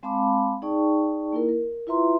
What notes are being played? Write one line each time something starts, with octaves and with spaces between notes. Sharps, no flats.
G#3 C4 F5 A5 B5 D6
D#4 G#4 D5 G5 A5 C#6
A#3 E4 A#4
A#4
E4 F4 B4 E5 A#5 C6